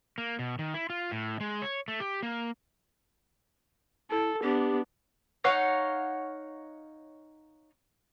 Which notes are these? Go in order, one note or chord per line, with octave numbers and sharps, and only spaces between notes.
A#3
B2
D#3
E4
F4
A2
G#3
C#5
A3
G4
A#3
E4 A4
B3 D4 G4
D#4 C#5 F5 F#5